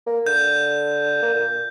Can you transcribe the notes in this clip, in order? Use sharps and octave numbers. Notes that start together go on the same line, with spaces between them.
A#3
D3 G6
A#3
A#2